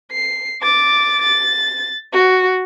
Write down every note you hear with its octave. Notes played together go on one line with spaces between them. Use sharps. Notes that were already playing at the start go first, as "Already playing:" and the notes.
C7
D6 A6
A6
F#4